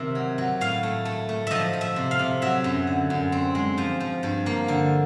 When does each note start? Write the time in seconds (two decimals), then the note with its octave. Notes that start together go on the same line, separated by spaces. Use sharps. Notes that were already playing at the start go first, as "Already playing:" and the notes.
Already playing: C3 D#3 E5
0.15 F#3
0.38 F#3
0.61 A2 F5
0.83 A3
1.05 A3
1.29 A3
1.47 F3 D#5 E5
1.73 F3
1.81 E5
1.96 C3
2.11 F5
2.19 C3
2.42 F#3 E5
2.64 F#2
2.87 D3
3.10 F#2
3.32 C4
3.55 G#3
3.78 F3
4.00 F3
4.23 G2
4.46 A#3
4.68 D3